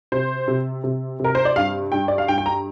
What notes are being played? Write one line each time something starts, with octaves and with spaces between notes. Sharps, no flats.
C3 C5
C3
C3
C3 A#4
C5
D5
G2 F5
G2 G5
D5
F5
G2 G5
G5
A#5